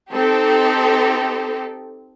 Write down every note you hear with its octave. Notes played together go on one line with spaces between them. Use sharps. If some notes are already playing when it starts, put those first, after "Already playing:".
C4 D#4 G4 A4